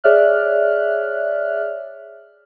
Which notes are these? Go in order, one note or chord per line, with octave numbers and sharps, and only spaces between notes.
G#4 C#5 D5 E5 F6 F#6